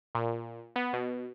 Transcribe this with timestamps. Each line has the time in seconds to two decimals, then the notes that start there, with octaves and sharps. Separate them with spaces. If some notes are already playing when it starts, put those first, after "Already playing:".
0.15 A#2
0.76 B3
0.93 B2